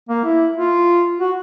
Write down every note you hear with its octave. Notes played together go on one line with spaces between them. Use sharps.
A#3
E4
F4
F#4